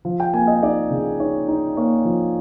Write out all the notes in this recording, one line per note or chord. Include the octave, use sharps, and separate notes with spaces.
F3
G5
A#3 G#5
D#5
D#4 D5
C#3
D#4 C#5
D#4
A#3 C#5
F3